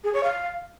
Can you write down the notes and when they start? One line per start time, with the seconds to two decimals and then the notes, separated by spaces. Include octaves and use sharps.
0.04 G#4
0.13 C#5
0.23 F5